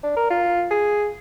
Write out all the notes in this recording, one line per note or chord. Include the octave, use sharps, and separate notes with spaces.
D4
A#4
F4
G#4